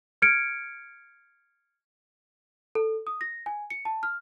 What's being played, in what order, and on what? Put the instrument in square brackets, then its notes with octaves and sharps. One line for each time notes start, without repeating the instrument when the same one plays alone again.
[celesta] F6 G#6 C#7 D7
A4
D#6
A#6
G#5
C#7
A5
F6